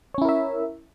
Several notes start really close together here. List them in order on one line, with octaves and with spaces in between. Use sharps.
C#5 C#4 E4 A#4 E5